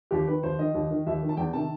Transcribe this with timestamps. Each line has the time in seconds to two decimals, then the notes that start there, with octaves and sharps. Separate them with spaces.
0.11 D#2 G4
0.27 D#3 B4
0.43 D#2 C5
0.59 D#3 D#5
0.74 D#2
0.90 D#3
1.06 D#2 E5
1.22 D#3
1.29 A5
1.37 E2 G5
1.53 C3 D#3 A5